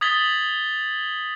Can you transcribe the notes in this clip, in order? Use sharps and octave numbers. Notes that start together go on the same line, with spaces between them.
D#6 G#6 A6 B6 F#7 G7